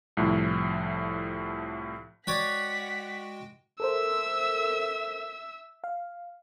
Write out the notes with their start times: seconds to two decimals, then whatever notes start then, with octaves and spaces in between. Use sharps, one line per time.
0.17 C2 A2 F3
2.27 G#3 F#4 B4 C#5 D5 F#5 G5 B6
3.80 A4 A#4 C5 E5 E6
5.84 F5